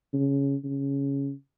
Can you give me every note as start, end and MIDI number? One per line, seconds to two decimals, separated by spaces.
0.14 0.56 49
0.64 1.32 49